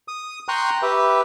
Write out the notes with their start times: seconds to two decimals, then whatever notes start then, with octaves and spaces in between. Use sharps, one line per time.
0.08 D#6
0.49 G5 A#5 C6 C#6 F#6
0.82 G4 B4 E5